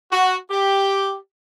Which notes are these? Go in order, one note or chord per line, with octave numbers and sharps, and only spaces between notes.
F#4
G4